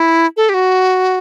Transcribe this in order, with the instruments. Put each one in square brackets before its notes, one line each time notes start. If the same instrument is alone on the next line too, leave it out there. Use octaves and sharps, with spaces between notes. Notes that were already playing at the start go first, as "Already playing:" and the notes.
Already playing: [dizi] E4
A4
G4
F#4